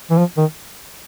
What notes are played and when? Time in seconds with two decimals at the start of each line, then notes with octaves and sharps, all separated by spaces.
0.10 E3
0.18 F3
0.37 D#3